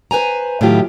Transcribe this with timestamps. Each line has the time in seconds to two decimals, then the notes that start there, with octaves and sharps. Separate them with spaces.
0.11 B4 C5 G#5 A#5
0.61 A2 D#3 F#3 E4 F4 G4